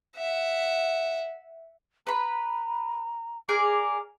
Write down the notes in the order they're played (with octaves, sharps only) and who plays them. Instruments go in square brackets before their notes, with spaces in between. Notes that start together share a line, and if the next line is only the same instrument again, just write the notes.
[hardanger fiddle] E5 F#5
[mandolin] B4 B5 [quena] A#5
[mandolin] G#4 A#4 D5 [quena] D6